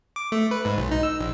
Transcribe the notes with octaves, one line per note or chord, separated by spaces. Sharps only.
D6
A3
B4
G#2
B1
D#4
E6
A#1